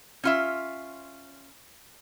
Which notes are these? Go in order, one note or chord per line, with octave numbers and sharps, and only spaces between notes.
C#4 F4 E5